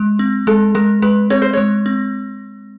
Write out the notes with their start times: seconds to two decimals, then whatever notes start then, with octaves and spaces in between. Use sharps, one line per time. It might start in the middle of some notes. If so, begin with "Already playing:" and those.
Already playing: G#3
0.19 C4
0.47 G#3 A4
0.75 G#3 A#4
1.02 G#3 B4
1.30 C4 C#5
1.42 C5
1.53 G#3 C#5
1.86 C4